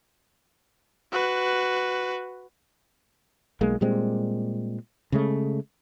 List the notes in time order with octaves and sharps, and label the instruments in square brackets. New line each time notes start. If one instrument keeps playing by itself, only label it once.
[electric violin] F#4 B4
[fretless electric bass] B1 G#3 A#3
A#2 G3 G#3 C4
C#3 G#3 A3